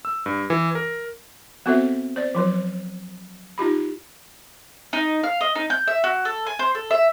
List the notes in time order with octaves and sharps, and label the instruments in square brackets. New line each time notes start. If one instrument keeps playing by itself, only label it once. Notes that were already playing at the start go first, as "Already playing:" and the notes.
[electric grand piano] E6
G2
E3
A#4
[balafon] B3 C4 F#4 A4 C5 E5
C5 D5
F3 F#3 B4
D#4 F4 G4 B5
[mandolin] D#4
F5
D#5
D#4
G6
E5
F#4
A4
G#5
C5
A4
E5